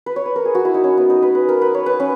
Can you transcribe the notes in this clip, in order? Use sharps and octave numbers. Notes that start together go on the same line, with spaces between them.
B4
C#5
B4
A#4
G#4
F#4
E4
D#4
C#4
B3
D#4
B4
B4
A#4
B4
C#5
B4
C#4